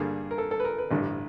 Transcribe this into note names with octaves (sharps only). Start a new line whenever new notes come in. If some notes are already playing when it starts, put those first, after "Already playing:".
Already playing: G2 D3 G3 A#3 G#4
A#4
A4
A4
B4
A#4
B4
A1 G2 D3